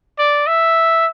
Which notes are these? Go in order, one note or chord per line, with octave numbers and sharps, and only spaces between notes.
D5
E5